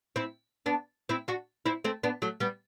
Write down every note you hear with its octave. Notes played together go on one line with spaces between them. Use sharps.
C4 E4
B3 D4
C4 E4
D4 F#4
C4 E4
A3 C4
B3 D4
F#3 A3
G3 B3